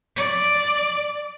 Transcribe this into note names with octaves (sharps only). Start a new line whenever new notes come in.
D5